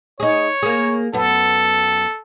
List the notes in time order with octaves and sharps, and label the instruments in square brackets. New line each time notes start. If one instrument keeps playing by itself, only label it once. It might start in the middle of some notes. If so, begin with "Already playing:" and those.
[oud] D#4 G#4 [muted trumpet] C#5
[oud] A#3 G#4
[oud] F#2 B3 [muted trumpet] A4